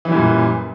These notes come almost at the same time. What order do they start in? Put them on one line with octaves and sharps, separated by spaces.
E3 G3 F#2 A#2